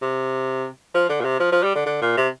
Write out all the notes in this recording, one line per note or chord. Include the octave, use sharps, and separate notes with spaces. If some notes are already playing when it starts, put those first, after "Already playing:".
C3
F3
D3
A#2
C3
F3
F3
G3
D3
D3
A#2
C3